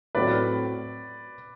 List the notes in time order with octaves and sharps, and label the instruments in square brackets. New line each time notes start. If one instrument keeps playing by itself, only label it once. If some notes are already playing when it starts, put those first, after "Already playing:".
[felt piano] A2 F#3 A3 C4 [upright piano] B4 D5